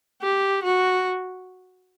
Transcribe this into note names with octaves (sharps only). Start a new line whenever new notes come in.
G4
F#4